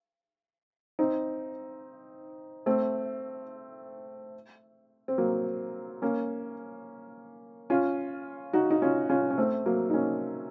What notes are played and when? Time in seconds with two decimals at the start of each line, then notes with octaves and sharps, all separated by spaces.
0.99 C4 D#4
2.66 A3 C4
5.08 C4
5.18 F#3 A#3
6.02 A#3 C#4
7.70 C#4 F4
8.53 D#4 F#4
8.70 D#4
8.82 C#4 F4
9.10 C#4 F4
9.30 C#4
9.38 A3 C4
9.66 F#3 A#3
9.90 D#4
9.94 A#3 C#4